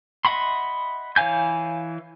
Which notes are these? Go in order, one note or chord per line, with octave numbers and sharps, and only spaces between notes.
D#5 E5 F#5 B5 C6
E3 C#5 F5 G#5 G6